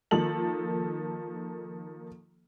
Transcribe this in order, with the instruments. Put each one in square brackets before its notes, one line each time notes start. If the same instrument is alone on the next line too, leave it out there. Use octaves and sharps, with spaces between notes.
[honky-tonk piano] D#3 F3 A#3 A4 F#7